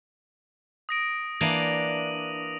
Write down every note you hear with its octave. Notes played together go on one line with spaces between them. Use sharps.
D#6 A#6 D7
E3 A#3 D4 D#7 F7 F#7